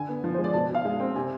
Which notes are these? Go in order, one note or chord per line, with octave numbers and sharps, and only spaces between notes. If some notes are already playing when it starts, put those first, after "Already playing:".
Already playing: D3 G#5
B3
F3
G#3 C5
D5
B2 A5
B2 F5
G#3
C4
C3 G#5